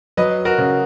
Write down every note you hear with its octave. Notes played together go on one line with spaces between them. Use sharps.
F#3 B4 D#5
F#4 A#4
C#3